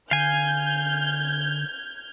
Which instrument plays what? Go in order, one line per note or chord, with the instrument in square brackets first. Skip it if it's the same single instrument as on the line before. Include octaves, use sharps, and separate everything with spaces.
[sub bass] D3 [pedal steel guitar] F5 G#5 [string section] F6 G6 G#6